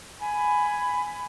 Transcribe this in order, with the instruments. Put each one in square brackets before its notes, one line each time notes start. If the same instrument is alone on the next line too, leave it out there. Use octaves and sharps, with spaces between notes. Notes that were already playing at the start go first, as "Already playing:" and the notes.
[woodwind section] G#5 B5